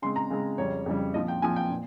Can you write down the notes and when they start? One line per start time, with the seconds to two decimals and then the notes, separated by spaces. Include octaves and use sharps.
0.02 C#3 G#3 C4 C6
0.16 A#5
0.30 C#3 G#3 C4
0.58 F2 C#3 G3 C#5
0.86 F2 C#3 G3
1.14 A#2 F3 C4 D#5
1.28 G5
1.42 A#2 F3 C4 G#5
1.56 G5
1.70 A#2